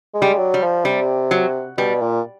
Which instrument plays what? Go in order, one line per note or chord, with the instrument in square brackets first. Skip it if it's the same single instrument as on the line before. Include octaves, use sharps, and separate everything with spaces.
[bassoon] G#3
[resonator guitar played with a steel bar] G3
[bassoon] F#3
[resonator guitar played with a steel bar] G3
[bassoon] F3
[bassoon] C3 [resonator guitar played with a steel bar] G3
[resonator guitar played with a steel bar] F#3
[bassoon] B2 [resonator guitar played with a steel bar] G3
[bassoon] A#2